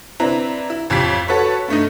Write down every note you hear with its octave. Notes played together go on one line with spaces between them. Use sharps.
C4 D4 E4 B4 A#5
E4
A1 F2 F3 G4 G#6 B6
F#4 A4 B4 C#5
G2 A3 D#4